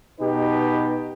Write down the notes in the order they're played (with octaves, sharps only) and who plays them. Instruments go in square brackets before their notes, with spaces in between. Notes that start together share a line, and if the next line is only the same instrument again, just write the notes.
[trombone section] B2 D#4 G4 B4